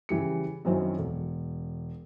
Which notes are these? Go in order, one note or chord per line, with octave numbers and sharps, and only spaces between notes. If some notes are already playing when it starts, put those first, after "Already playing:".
C#3 E3 G3 C#7
F#2 D#3 F#3 C4 C#4 E4
E1